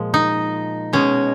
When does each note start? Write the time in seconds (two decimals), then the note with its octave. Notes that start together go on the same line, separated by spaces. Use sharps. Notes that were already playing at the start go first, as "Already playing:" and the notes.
Already playing: A#2 F3 G#3
0.14 D#4
0.93 B2 G#3 C#4